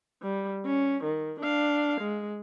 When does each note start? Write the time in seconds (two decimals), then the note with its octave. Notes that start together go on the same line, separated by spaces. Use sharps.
0.23 G3
0.65 C#4
1.04 D#3
1.41 D4 F5
2.01 G#3